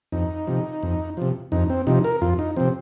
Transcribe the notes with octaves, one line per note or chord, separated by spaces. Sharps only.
F2 D#4
C3 F3
F2
C3 F3
F2 D#4
C4
C3 F3 D#4
A#4
F2 F4
D#4
C3 F3 C4